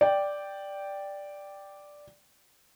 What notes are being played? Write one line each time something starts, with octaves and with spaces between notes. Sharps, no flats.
D5 G5